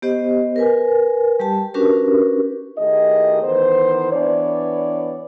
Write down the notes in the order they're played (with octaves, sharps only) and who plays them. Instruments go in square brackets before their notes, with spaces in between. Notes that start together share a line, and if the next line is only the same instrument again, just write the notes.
[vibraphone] B3 G4 C5 D#5
A#4 B4 G#5
G3 G4 A5
C#4 D4 F#4 G4 A#4 B4
[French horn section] D#3 A3 E4 G4 G#4 D#5
D#3 E3 B3 C5
E3 B3 D4 C#5 D5